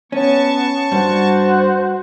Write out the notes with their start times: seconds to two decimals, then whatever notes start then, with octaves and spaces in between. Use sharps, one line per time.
0.12 B3 C#4 A5 C#6
0.92 G2 F#4 C5